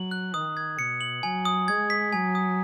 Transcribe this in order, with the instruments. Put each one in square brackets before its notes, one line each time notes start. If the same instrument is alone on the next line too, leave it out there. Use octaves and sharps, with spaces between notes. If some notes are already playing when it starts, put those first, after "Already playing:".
Already playing: [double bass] F#3 [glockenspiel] F#7
[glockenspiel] F#6
[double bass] D#3 [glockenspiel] D#6
[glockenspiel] G#6
[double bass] B2 [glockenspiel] C#7
[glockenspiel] F#7
[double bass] F#3 [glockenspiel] G#5
[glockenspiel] D#6
[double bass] G#3 [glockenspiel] G#6
[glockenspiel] B6
[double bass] F#3 [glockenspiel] G#5
[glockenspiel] D#6